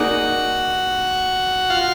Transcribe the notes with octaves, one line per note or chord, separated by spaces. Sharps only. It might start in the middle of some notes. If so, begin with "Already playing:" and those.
Already playing: A#3 D#4 F#4 G#4 D5 F#5
F4 F5